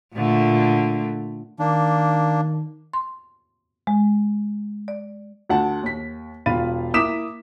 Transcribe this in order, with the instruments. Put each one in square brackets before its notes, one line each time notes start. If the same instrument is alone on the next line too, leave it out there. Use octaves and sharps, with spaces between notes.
[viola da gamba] A#2 D3 A3
[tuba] D#3 [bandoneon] A#3 D4
[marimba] C6
G#3
D5
[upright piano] D2 F#5 A5
D#2 B6
E1 F4 F5 B5 A6 D#7
A#3 E4 D6 D#6 B6 E7